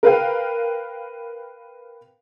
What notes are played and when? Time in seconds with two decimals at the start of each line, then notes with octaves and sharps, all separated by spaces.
0.03 A#4 B4 F5 G5